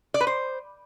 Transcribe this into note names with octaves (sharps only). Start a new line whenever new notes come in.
D5
B4
C5